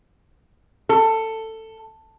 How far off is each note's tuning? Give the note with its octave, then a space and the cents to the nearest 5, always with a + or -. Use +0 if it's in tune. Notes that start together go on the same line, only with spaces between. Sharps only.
A4 +15